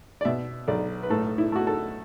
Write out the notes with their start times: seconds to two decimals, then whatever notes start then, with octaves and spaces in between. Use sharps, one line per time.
0.21 D5
0.25 B2 E5
0.68 B1 D5
1.03 B4
1.10 A2 A4
1.38 E4
1.52 A3 F#4
1.67 A4